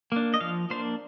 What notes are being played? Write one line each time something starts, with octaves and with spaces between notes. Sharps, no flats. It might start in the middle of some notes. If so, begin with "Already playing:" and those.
A#3 D4
D#5
F3 F5
A#3 D4 C5